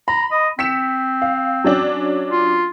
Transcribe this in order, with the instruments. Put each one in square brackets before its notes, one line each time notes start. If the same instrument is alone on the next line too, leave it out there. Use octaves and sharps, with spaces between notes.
[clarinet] A#5 [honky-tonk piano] B5
[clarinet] D#5
[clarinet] C4 [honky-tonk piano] B6 C#7 E7
[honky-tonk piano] F5
F#3 C#4 D4
[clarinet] F4